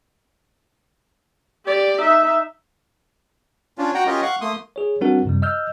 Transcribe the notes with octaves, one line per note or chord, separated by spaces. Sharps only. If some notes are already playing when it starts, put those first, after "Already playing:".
G4 D5
D#4 E5
C#4 D4 F4
F#4 F#5 G5 A#5
C#4 F4 G4 A#4 D#5
F5 F#5 C#6
A3 A#3 C6 D#6
G#4 C#5
G3 C4 D4 F#4 A#4 F#5
F#2 C3 G3
D#5 E6 F6 G6